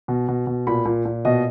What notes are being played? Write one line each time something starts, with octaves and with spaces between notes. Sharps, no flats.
B2
B2
B2
A#2 B5
A#2
A#2
B2 D#5